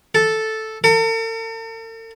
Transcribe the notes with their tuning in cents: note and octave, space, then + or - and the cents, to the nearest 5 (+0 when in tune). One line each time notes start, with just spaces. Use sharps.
A4 -5
A4 +45